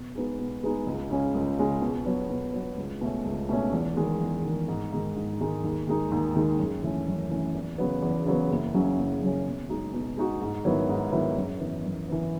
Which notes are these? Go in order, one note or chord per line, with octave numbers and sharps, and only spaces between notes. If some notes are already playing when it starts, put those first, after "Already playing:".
Already playing: B2
G#3 B3 D#4 G#4
B2
G#3 B3 D#4 G#4
C#2
C#3 G#3 C#4
C#2
C#3 G#3 C#4
B2
F#3 B3
B2
F#3 B3
C#2
B2 A3 C#4
C#2
B2 A3 C#4
E2
D#3 G#3
E2
D#3 G#3
G#2
D#3 G#3 D#4
G#2
D#3 G#3 D#4
D#2
D#3 G#3 D#4
D#2
D#3 G#3 D#4
F#2
E3 A3 C#4
F#2
E3 A3 C#4
E2
C#3 F#3 B3
E2
C#3 F#3 B3
F#1
F#2 C#3 F#3 C#4
F#1
F#2 C#3 F#3 C#4
B2
G#3 D#4 F#4
B2
G#3 D#4 F#4
G#2
D#3 F#3 B3 E4
G#2
D#3 F#3 B3 E4
F#2
E3 B3
F#2
E3 B3